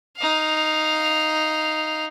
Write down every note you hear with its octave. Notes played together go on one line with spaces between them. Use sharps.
D#4 F5